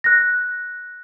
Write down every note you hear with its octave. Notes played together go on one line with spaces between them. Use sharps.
F#6 A#6